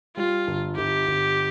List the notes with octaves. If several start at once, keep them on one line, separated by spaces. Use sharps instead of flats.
G3 F4
G1
G1 G4
G1